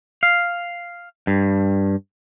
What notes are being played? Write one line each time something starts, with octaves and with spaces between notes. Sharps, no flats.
F5
G2